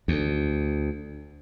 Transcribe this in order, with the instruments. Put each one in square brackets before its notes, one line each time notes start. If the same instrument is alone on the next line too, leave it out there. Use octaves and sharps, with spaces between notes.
[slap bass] D2